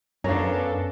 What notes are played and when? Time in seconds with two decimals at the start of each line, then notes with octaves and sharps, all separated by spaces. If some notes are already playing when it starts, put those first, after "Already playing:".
0.24 F#2 B3 C#4 D4 A4 A#4 F5